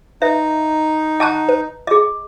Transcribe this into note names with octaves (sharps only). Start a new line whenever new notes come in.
D#4 B4 E5
D#5 F#5 A5 A#5 C#6 F#6
B4
G#4 D#5